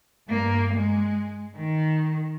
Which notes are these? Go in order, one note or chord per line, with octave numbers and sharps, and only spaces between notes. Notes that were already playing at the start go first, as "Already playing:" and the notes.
G2 A#3
G#3
D#3